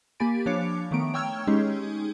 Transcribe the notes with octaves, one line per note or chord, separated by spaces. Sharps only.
A#3 G4 G#5 B5 A6 D7
F3 D4 C#5 F5 D6 C#7
D#3 A3 B3 A#5 D7
C#5 G5 C#6 E6 F6 G#6
G#3 C#4 D#4 G4 G#4